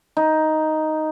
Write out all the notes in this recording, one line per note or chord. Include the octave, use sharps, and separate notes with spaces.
D#4